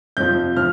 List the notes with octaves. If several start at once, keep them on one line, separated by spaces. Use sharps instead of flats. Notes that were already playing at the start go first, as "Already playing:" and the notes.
F2 C3 F3 G6
F3 F6